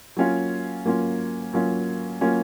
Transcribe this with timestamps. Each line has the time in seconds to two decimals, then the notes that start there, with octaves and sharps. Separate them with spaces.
0.17 F#3 A#3 C#4 F4
0.85 F#3 A#3 C#4 F4
1.53 F#3 A#3 C#4 F4
2.21 F#3 A#3 C#4 F4